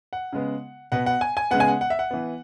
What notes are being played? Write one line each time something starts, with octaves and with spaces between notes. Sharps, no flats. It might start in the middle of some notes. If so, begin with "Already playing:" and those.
F#5
C#3 G#3 B3
B2 B3 F#5
F#5
G#5
G#5
C#3 G#3 B3 F#5
G#5
F#5
F#5
E5
F#5
E3 B3